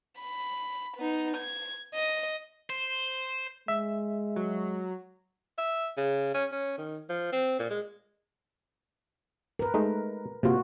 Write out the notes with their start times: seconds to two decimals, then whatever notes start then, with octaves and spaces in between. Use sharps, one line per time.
0.20 B5
0.97 B3 D#4
1.37 G#6
1.94 D#5
2.70 C5
3.68 G#3 E5
4.36 F#3
5.58 E5
5.97 C#3
6.34 C#4
6.52 C#4
6.78 D#3
7.09 F3
7.33 C4
7.59 A#2
7.70 G#3
9.59 A#4 B4
9.74 G#3 A3 D#4
10.43 C3 A#3 F4 F#4